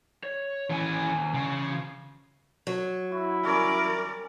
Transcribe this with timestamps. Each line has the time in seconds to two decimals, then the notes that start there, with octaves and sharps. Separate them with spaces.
0.23 C#5
0.70 D#2 E3 C#4 G#5
1.35 C#3 E3 F5
2.67 F#3
3.12 E4 F#4
3.43 G3 C#4 A#4 D5